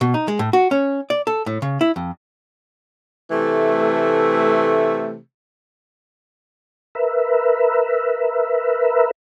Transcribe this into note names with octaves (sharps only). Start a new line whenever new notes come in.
B2
D#4
G#3
A2
F#4
C#4
D5
A4
A2
C#3
E4
F2
C3 E3 A3
A#4 B4 E5